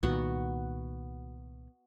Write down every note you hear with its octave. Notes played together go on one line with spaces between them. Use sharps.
C2 A#2 D#3 B3 F#4